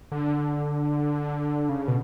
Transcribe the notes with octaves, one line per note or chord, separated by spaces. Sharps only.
D3
C#3
B2